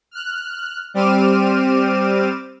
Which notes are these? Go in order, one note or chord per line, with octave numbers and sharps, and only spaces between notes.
F6 F#6
G3 C4 D6 F6 D#7 E7